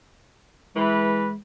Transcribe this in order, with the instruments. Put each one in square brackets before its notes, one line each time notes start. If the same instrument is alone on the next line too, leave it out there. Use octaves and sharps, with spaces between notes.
[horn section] E3 B4 [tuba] G#3